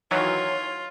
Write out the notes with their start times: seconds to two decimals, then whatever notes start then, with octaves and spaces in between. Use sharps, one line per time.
0.11 D#3 E3 F#3 F4 C#5